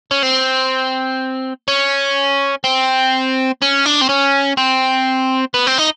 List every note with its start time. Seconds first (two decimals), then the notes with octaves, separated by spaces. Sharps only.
0.11 C#4
0.23 C4
1.68 C#4
2.64 C4
3.62 C#4
3.86 D4
4.02 C4
4.10 C#4
4.58 C4
5.54 B3
5.67 C4
5.78 D#4